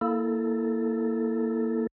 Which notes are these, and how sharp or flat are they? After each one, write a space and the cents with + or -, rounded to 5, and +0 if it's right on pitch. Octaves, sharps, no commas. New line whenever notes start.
A#3 +0 E4 +0 A4 +0